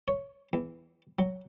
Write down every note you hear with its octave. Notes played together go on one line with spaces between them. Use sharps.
C#5
E2
F#3